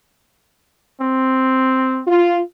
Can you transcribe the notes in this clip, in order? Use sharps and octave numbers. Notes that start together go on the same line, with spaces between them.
C4
F4